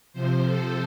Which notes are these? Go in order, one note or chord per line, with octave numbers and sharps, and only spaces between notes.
C3 F3 C5
A4